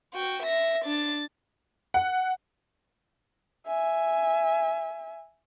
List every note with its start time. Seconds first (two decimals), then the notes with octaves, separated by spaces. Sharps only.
0.14 F#4 G5
0.43 E5 A#6
0.85 D4 A6
1.94 F#5
3.67 E5 G#5